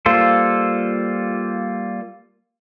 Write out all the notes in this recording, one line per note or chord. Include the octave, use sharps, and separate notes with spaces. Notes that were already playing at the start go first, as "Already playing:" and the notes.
G3 A#3 F4 A4 C5